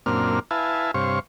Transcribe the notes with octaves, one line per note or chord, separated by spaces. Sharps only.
F#2 A#2 A#3 C4 D4 F6
E4 B4 E5 F5 G#5 A5
G2 C3 C5 C#5 F5 C#6